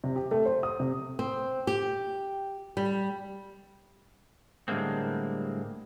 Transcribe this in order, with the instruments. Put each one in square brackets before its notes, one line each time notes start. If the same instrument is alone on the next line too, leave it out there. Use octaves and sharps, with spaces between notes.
[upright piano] C3
G4
A3
C5
D#6
C3
[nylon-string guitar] C4
G4
G3
[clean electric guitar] A2 D3 G3 G#3 A#3 C4